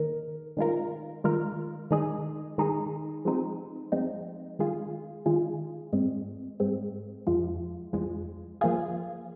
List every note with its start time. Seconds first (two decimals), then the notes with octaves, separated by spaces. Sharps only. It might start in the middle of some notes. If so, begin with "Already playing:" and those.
Already playing: D#3 A#3 D#4 A#4
0.57 D#3 G#3 F4 A#4
1.24 D#3 G#3 F4 A#4
1.91 D#3 G#3 D#4 G#4
2.58 D#3 G#3 D#4 G#4
3.25 F3 G#3 C4 D#4
3.92 F3 G#3 C4 D#4
4.59 D#3 G#3 F4 G#4
5.26 D#3 G#3 F4 G#4
5.93 G#2 G#3 C4
6.60 G#2 G#3 C4
7.27 F2 F3 G#3
7.93 F2 F3 G#3
8.61 F3 A#3 F4 G#4